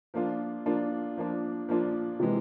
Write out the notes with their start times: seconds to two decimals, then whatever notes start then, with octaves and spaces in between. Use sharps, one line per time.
0.14 F3 A#3 D4 F4
0.66 F3 A#3 D4 F4
1.17 F3 A#3 D4 F4
1.69 F3 A#3 D4 F4
2.20 C3 E3 G#3